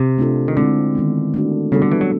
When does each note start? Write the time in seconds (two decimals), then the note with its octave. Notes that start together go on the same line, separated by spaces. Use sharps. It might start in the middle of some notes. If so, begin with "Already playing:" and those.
Already playing: C3
0.18 A3 D4 F4 A4
0.48 D#3
0.57 D3 G#3 C4 E4
0.95 D#3 G#3 B3
1.34 A3 D4 F#4
1.72 C#3 G3 B3 D4 F#4 A4
1.82 D3
1.92 E3
2.01 F#3